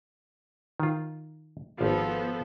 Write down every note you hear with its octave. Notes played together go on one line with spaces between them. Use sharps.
D#3 F4
G#1 F3 B3 F4 A4